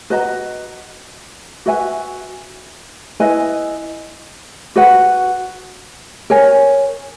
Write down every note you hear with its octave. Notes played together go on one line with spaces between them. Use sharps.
F#4 B4 D#5 A#5
F#4 B4 E5 G#5
E4 B4 D#5 G#5
F#4 B4 F#5
A#4 C#5 G#5